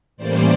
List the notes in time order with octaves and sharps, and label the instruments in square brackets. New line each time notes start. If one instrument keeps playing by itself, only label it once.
[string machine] A2 E3 G3 A#3 C#4 C5 D5